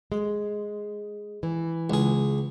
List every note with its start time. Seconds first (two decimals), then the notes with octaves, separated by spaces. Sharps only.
0.12 G#3
1.43 E3
1.90 C#2 G#4